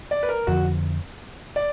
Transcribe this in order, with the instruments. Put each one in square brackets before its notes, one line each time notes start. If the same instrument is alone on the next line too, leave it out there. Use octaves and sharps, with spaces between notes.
[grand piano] D5
B4
A#4
[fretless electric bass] F2 D3 F3 [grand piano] F#4
[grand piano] D5